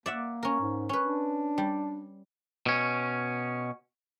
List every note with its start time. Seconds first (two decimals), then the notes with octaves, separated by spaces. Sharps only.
0.06 A#3 D5 E5 F#5
0.43 C#4 A#4
0.60 G#2
0.89 C#4 B4
1.03 D4
1.58 G3
2.66 B2 C#4